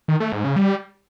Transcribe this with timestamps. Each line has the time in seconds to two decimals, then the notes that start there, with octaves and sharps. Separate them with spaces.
0.08 D#3
0.20 A3
0.32 G#2
0.44 C#3
0.56 G3